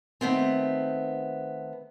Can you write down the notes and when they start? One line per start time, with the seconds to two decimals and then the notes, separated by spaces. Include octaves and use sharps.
0.21 D#3 A3 B3 C4